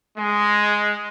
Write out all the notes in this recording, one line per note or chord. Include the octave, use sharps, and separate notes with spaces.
G#3